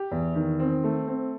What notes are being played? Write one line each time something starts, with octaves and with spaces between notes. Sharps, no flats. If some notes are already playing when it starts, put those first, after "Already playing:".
Already playing: G4
E2
D#3
C4
A3
C4